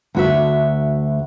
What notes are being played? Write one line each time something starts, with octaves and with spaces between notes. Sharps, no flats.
D2 F#4 E5